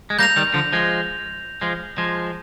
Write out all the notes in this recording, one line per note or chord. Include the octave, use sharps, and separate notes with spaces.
G#3
G3 A#3 G6 A#6 F7
D#3 G3
D3 F3
F3 G#3
F3 G#3
F3 G#3